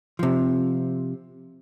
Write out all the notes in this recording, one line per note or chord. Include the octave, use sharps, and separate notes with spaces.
C3 F3